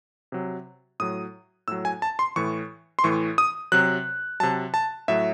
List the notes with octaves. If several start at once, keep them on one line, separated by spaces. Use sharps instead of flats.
C3 F#3
A2 F#3 D#6
A2 F#3 E6
G#5
A5
C6
A2 E3 C#6
C6
A2 E3 C#6
D#6
C3 F#3 F#6
C3 F#3 A5
A5
A2 F#3 E5